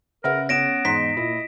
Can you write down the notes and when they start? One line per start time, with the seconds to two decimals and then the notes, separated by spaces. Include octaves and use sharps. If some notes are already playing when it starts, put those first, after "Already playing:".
0.24 C#3 A#4 B4 E5 F#5
0.49 B3 C#4 C#5 A#6 D7 E7
0.85 E2 G#2 D#4 C6 B6
1.17 A#2 E4 D#5